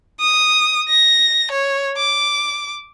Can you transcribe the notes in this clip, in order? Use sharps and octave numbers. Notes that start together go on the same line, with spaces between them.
D#6
A#6
C#5
D6